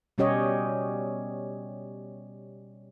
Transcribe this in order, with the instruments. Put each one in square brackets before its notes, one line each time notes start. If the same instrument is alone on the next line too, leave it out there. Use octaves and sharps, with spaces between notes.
[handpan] B2 G3 C#4 G4 C#5 D#5